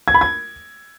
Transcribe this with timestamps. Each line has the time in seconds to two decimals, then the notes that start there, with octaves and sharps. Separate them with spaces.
0.08 G#6
0.14 B5
0.21 G#6